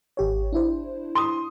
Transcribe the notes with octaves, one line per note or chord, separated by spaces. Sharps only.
G#1 G4 C#5
D4 E4 C5
C6 D#6